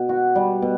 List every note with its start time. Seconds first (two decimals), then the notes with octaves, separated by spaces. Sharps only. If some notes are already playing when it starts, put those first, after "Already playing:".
Already playing: B2
0.09 F#4
0.35 G3
0.62 B2